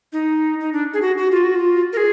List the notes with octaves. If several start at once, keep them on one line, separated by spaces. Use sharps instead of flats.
D#4
D#4
D4
G#4
F#4
F#4
F4
F#4
F4
A#4
G#4